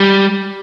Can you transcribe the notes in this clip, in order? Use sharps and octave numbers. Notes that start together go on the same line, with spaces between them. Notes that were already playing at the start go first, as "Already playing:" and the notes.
Already playing: G3